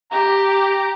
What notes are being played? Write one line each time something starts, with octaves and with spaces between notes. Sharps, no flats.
G4 A#5